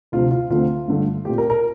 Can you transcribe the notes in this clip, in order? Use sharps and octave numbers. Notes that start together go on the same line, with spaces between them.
D2 C3 F3 F4
F4
D2 D3 A3 C4 F4
G2 D3 A3
A#2 A3 C4 G4
A#4
A#4